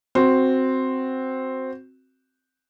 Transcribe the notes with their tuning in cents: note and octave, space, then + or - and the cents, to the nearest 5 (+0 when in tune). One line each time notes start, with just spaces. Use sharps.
C4 +0 F#4 +0